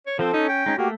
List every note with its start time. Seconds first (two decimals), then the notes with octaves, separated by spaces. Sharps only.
0.07 C#5
0.19 F3 C4 A4 C5
0.34 C#4 D#4
0.49 G5
0.66 G#3 C#4 D#4
0.78 A3 A#3 F#4 G4